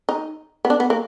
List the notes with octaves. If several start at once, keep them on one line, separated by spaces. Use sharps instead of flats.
D#4
B3
D4
B3
A#3